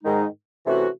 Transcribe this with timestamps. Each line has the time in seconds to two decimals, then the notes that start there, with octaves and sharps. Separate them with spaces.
0.04 G#2 D#3 G#3 D#4
0.66 C3 E3 A3 C#4 F#4